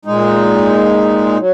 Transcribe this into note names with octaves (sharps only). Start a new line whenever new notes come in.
A#2 G#3 D#4
F#3